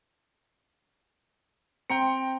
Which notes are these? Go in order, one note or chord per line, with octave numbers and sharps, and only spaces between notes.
C4 G5 A#5 C#7